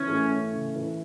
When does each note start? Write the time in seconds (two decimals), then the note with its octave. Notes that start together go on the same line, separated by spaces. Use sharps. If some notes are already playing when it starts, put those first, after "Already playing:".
Already playing: E3 C#4
0.08 A3
0.31 C#4
0.53 C#3
0.75 E3